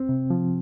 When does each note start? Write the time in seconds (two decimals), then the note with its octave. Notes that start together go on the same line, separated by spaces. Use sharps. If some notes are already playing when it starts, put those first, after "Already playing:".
Already playing: C4
0.09 C3
0.30 F3